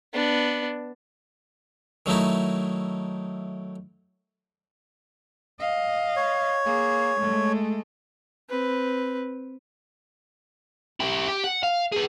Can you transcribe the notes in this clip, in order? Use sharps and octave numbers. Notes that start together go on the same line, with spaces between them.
B3 D4
D#3 F#3 A3 D#4 E4
D#5 F5
C#5
A#3 G#4
G#3 A3
C4 B4
E4 G4
G4
F#5
F5
G#4 B4